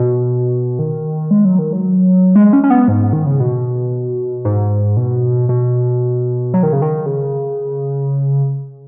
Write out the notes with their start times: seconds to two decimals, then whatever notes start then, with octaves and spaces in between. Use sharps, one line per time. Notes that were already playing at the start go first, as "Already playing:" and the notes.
Already playing: B2
0.79 D#3
1.31 G#3
1.45 F#3
1.59 D#3
1.73 F#3
2.36 G#3
2.53 C#4
2.64 C#4
2.70 B3
2.88 G#2
3.13 D#3
3.26 C#3
3.40 B2
4.45 G#2
4.97 B2
5.49 B2
6.54 F#3
6.63 D#3
6.73 C#3
6.82 D#3
7.06 C#3